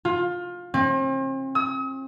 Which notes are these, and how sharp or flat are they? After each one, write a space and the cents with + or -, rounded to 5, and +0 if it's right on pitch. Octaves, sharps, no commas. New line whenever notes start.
F4 +20
C4 +40
D#6 +45